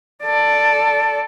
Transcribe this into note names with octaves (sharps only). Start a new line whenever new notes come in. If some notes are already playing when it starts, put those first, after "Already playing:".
A4 D5